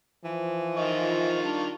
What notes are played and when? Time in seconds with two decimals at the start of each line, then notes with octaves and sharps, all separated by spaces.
0.24 E3 F3
0.76 D#3 F4 D#5 C#6
1.43 G3 D4